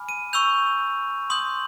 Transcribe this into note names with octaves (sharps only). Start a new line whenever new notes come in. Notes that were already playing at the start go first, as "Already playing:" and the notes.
Already playing: G#5 B5 D6 F6
D#7
C#6 E6 G6 F7
C6 D#6 G6 F#7